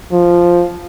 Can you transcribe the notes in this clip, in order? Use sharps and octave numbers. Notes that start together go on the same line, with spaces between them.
F3